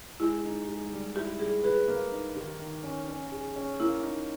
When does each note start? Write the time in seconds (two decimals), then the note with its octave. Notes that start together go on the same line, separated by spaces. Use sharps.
0.20 G#3 E4
0.45 D#4
0.68 G#3
0.92 G3
1.16 E4 G4
1.39 G3 G#4
1.63 G#4 B4
1.88 A#3
2.12 D#4
2.35 D#3 G4
2.60 D#3
2.83 C#4
3.08 C#4
3.32 G#4
3.56 C#4
3.80 A#3 E4
4.03 D#4